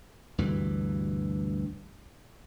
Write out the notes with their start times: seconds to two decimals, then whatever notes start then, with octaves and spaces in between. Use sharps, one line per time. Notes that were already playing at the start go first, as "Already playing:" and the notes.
0.38 D2 G2 B2 E3